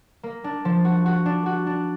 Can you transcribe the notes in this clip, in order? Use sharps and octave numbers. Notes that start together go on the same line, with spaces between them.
A#3
D4
F3
F#4
F#4
D4
F#4
D4